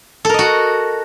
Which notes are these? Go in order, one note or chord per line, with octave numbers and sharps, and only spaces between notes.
F#4 A4 A#4 D#5